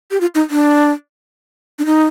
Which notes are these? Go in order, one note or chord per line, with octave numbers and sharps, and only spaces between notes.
G4
F4
D#4
D4
D4
D#4